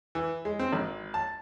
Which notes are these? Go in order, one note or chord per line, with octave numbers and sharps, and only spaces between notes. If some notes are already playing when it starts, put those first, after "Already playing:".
E3
G#3
C4
G#1
A5